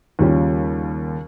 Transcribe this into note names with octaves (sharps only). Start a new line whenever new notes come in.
D#2 C#3 G3 C#4 F4